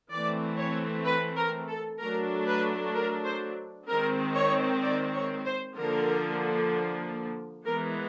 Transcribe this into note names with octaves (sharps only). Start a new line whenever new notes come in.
E3 A3 C4 D5
C#5
B4
A#4
A4
F#3 A3 D4 A#4
B4
A#4
C5
D#3 G#3 C4 A#4
C#5
D5
C#5
C5
D3 F3 A#3 A#4
E3 G#3 B3 A#4